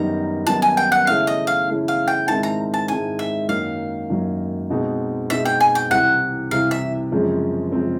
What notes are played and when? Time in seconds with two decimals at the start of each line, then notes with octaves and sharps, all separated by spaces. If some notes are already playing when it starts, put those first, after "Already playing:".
Already playing: F#2 D#3 G3 B3 D#4 A#5
0.47 F#2 D#3 G3 B3 D#4 A5
0.62 G#5
0.77 G5
0.92 F#5
1.07 C#3 E3 A3 C#4 E4 F5
1.27 D#5
1.47 F5
1.67 C#3 E3 A3 C#4 E4
1.88 F5
2.08 G5
2.28 G#2 D#3 G#3 C4 E4 A5
2.43 A#5
2.74 A5
2.88 G#2 D#3 G#3 C4 E4 G#5
3.19 E5
3.48 F#2 D#3 F#3 A#3 F5
4.10 F#2 D#3 F#3 A#3
4.70 B2 G#3 C4 D#4
5.30 B2 G#3 C4 D#4 E5
5.45 G5
5.60 G#5
5.75 G5
5.91 C2 C3 E3 F#5
6.51 C2 C3 E3 F5
6.71 E5
7.12 F#2 C#3 F3 G#3 C4
7.72 C#3 F3 G#3 C4